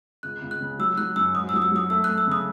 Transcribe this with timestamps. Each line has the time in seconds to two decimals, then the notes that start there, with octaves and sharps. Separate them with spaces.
0.23 C#2 F#6
0.42 C#2
0.51 F#6
0.61 C#3
0.79 F#3 E6
0.97 F#3 F#6
1.16 F#2 E6
1.34 G#2 D#6
1.49 E6
1.54 F#3 D#6
1.62 E6
1.72 F#3 D#6
1.90 A3 E6
2.04 A3 F#6
2.18 E6
2.27 C#3 D#6